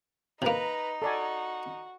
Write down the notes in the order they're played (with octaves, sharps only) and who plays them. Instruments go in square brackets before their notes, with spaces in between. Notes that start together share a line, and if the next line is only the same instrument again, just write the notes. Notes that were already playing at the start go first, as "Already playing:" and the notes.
[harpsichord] C3 A#3 [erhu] D#4 [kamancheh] B4 A#5
[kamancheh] F#4 [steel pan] A4 D5 G#5